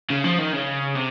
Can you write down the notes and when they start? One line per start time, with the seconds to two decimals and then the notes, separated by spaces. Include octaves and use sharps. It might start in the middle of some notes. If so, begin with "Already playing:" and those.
0.10 C#3
0.24 F3
0.38 D#3
0.52 C#3
0.95 C3